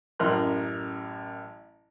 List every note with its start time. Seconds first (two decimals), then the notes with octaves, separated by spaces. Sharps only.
0.19 A1 F#2 A#4 C6 F#6